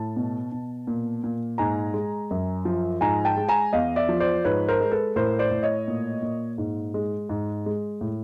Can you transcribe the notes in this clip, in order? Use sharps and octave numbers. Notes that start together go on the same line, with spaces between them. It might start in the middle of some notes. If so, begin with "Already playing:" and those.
Already playing: A2 A5
B2
B2
A#2
A#2
G#2 G#5 A#5
G#3
F#2
F3
G#2 G#5 A#5
G5 A5
G#3
G#5 A#5
E2 D#5 F5
D5 E5
F3
C5 D5
G#2 B4 C#5
A#4 C5
G#3
A4 B4
A2 A#4 C5
C5 D5
A2
C#5 D#5
A#2
A#2
G#2
G#3
G#2
G#3
A2